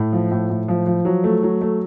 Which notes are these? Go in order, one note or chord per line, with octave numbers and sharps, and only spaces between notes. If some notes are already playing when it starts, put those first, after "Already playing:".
Already playing: A2
F3
A2
A2
F3
F3
F#3
A3
F#3
A3